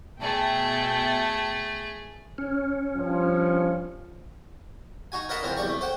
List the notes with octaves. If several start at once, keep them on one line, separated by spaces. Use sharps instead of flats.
B2 A3 G#4 E5 G5 A5
C#4
G2 F3
D#4 F#4 G#5
A#4 B4 D5 D#5 F#5 A5
C#2 E3 F3 C4 A#4
B1 E2 G3 D5 C#6
A3
C5 F#5 G5